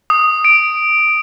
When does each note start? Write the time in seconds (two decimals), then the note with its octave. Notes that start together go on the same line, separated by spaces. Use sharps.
0.10 D#6
0.44 D7